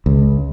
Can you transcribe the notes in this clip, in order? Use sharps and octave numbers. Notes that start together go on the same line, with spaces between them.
C#2